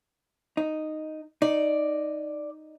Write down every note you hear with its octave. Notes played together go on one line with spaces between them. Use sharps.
D#4
D#4 D5